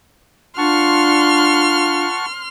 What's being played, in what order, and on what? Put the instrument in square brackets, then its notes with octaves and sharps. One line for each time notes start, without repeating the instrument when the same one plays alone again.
[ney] D4 [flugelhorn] F4 [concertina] F#5 A5 C#6 [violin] C6 F6